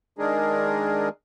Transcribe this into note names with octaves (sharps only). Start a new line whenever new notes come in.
D#3 G#3 D4 G#4 A#4